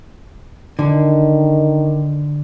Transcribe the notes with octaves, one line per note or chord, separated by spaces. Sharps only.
D3 D#3